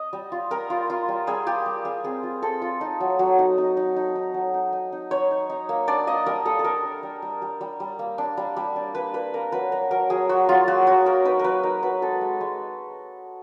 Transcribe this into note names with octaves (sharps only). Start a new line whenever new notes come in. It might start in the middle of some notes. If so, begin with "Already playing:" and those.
Already playing: D#5
G3
F4
G3 A#4
F4
F4
G3
G3 G#4
F4 G4
G3
G3 G#4
C4 G#4
F4
C4 A4
F4
D#4
F#3
F#3
D#4
D#4
D#4
D#4
D#4
F#3
D#4
D#4
D#4
D#4 C#5
D#4
D#4
A#3
D4 D5
A#3 D#5
G3 A#4
G3 A4
A4
D4 A#4
D4
G3
G3
G3
G3
G3
A#3
D4
G3
G3
D4
A#3 B4
A#3 B4
A#3 A#4
F#3 B4
F#3 A#4
F#3 A#4
F#3 G#4
F#3 F#4
F#3 F4
A#3 F#4
F#3 F#4
A#3 A#4
D#4 B4
F#3 A#4 B4
D#4 A#4
F#3 B4
G#3 A4
G#3
G#3